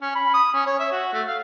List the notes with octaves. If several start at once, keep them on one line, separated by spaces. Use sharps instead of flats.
C#4
B5
D#6
C#4
C#5
E5
F#4
A3
F5